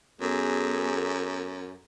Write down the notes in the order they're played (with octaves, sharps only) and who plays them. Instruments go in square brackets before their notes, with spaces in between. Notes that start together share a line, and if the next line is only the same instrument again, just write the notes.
[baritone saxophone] F#2 [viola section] B3 G#4 A4